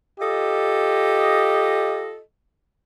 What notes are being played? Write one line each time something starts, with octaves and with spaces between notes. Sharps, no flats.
F4 G4 A4 D#5